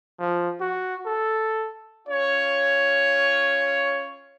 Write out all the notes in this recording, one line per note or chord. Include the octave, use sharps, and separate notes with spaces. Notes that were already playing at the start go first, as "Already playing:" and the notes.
F3
F#4
A4
C#4 F4 C#5